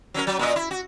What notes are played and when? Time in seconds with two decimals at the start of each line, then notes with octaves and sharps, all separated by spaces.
0.14 F#3 C#4 A#4
0.27 F#3
0.39 A#2 D#5
0.56 E4
0.71 F#4